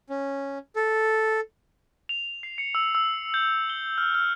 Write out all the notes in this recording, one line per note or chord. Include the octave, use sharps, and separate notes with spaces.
C#4
A4
F7
C7
C#7
E6
E6
G6
G7
F6
F6